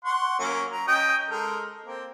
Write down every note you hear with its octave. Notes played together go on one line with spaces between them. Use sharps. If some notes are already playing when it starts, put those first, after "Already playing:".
F#5 C6 C#6
F#3 A#3 C#4
F#3 A#5
C#4 D#5 G5
G#3 A4 A#4
A#3 C4